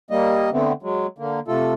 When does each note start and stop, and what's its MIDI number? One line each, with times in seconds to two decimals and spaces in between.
0.11 0.50 55
0.11 0.50 58
0.11 0.50 75
0.52 0.72 50
0.52 0.72 57
0.52 0.72 59
0.52 0.72 60
0.82 1.07 54
0.82 1.07 56
1.18 1.40 50
1.18 1.40 58
1.48 1.73 48
1.48 1.73 57
1.48 1.73 65
1.48 1.73 69